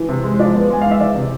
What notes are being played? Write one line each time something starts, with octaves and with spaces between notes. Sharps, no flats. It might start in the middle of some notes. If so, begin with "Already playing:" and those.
Already playing: E3
C3
G#3
C5
F3 D5
B3
G#3 G#5
E3 F5
E5
E3 D5
C3